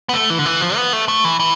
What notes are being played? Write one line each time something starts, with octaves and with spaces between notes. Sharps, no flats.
B3
A3
E3
D3
E3
F3
B3
A3
A3
E3
E3